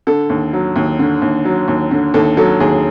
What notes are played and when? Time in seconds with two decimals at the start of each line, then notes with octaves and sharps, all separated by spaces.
0.07 D3 A4
0.30 D#2
0.53 F#3
0.76 D#2
0.99 D3
1.22 D#2
1.45 F#3
1.68 D#2
1.91 D3
2.14 D#2 A4
2.37 F#3 A4
2.60 D#2 G#4